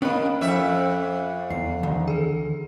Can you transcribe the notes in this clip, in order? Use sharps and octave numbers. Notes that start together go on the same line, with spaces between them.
A#3 C#4 D#5 G5 B5
F2 E5
E2 C7
D2 D#3 E3
G#4 A4